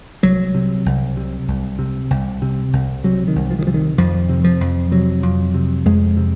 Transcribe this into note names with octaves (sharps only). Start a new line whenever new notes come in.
C2 F#3
C3
C2
C3
C2
C3
C2
C3
C2
C3 F#3
D#3
C2
F3
D#3
C3 F3
D#3
F2 F3
C3
F3
F2
C3 F#3
F2
C3
F2 G#3
C3